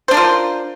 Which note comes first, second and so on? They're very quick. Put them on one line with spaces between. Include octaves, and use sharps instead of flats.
C5 D4 A#4 F4